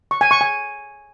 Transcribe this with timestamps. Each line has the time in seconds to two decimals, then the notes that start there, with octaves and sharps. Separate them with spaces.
0.11 C#6
0.21 G#5
0.31 C#6
0.41 G#5